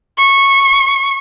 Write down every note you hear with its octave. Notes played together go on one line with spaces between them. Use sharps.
C#6